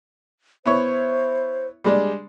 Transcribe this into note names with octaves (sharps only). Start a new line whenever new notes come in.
B3 E4 C5 C#5
G3 G#3 D4